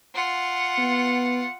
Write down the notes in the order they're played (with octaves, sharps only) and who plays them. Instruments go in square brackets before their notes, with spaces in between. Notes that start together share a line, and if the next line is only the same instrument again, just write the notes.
[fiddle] F4 F#5
[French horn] B3